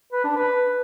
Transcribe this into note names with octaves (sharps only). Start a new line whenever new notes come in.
B4
D4
B4